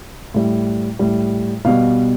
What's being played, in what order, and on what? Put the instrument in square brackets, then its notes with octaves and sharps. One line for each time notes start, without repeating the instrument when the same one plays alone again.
[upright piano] A2 G3
A2 G3
B2 G3 F5